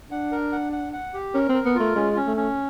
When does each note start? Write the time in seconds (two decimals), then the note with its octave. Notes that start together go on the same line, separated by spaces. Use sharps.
0.11 D4 F#5
0.32 A#4
0.52 F#5
0.73 F#5
0.93 F#5
1.14 G4
1.34 C#4 A#4
1.49 C4
1.54 A#4
1.65 B3
1.75 F4
1.80 A3
1.96 G#3 C#4
2.16 C#4
2.27 A3
2.37 C#4